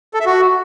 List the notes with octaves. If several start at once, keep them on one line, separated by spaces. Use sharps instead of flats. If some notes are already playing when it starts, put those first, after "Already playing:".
A4
E5
F#4